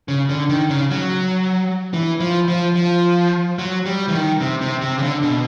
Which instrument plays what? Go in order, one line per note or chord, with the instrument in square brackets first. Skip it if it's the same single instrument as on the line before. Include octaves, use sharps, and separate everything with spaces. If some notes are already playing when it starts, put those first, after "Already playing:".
[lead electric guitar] C#3
D3
D#3
C#3
F#3
E3
F3
F3
F3
F#3
G3
E3
D#3
C3
C3
C3
C#3
D3
B2